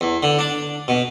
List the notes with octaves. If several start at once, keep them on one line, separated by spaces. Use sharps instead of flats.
E2
D3
D4
B2